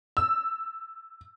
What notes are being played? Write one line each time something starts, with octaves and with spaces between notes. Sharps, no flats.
E6